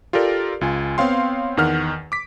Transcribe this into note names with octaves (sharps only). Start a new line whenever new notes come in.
F4 G4 A4 A#4 D5
C#2 F4 G#5
B3 C4 C#5 F5 G5 C6
E2 D#3 F#5 F6
D6 B6